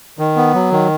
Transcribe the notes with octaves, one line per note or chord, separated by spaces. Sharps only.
D#3
B3
F#3
D#3